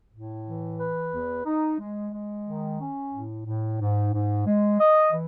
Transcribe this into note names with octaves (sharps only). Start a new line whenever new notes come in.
A2
E3
B4
E2
D#4
G#3
G#3
D#3
C#4
A2
A2
G#2
G#2
G#3
D#5
E3